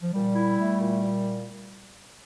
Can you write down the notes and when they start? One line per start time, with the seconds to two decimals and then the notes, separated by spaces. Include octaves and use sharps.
0.03 F3
0.13 A#2 G3
0.35 E4
0.57 A3
0.80 A#2
1.02 A#2